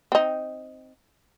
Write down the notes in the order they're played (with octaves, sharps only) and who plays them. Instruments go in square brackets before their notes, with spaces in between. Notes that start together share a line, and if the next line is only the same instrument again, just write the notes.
[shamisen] C4 D#4